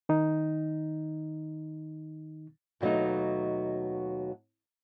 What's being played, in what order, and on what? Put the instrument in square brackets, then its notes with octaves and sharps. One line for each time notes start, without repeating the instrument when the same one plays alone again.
[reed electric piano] D#3 D#4
[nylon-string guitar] D#2 B2 F#3 A3 D#4